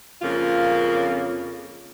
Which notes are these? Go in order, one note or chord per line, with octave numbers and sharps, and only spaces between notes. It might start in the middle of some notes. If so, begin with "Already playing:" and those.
F2 C#3 A#3 C#4 F4